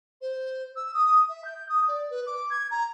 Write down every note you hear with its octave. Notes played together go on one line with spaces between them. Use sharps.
C5
E6
D#6
E5
G6
D#6
D5
B4
D6
G#6
A#5